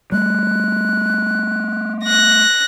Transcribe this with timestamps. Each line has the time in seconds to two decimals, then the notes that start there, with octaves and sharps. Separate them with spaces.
0.12 G3 A3 F#6
2.04 F#6 A#6